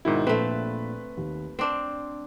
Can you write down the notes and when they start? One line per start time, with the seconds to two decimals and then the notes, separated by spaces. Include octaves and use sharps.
0.05 G#2 B2 D#3 D4 E4
0.27 A#1 A#2 A3 C4 B4
1.17 D#2
1.59 C4 D4 C5 C6